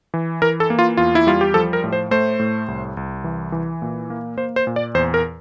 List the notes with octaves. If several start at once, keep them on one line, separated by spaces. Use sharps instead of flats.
E3
E3 A#4
A4
A#3
F4
E2 F4
E4
G3 F4
G4
F3 A4
A#4
A2
C5
A3 C5
A2
C2
C2
E3
E3
A#2
A#3
A#3 C5
C5
A#2
D5
E2 C5
A#4